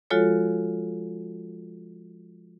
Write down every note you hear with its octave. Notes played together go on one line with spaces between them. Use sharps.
F3 G#3 F4 F#4 A4 C#5